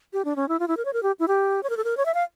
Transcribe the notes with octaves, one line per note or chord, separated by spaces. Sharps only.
G4
D4
C#4
E4
F4
E4
A#4
C#5
A#4
G4
E4
G4
C#5
A#4
A4
A#4
C#5
E5
F5